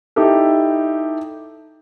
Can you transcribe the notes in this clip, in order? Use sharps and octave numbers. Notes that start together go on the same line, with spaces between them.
D#4 E4 G4 A4